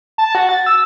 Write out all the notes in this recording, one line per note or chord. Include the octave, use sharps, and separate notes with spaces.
A5
F#4
A6
E6